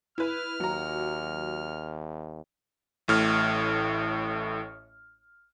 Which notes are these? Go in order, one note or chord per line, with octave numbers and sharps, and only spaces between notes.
E4 B4 F6
D#2 F#3 A#5
A1 A2 F6